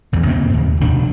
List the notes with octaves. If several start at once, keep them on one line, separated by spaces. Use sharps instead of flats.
A1 E2 E3
C#3 A#3 C4
D#2 A2
F1 B2 D#3 D4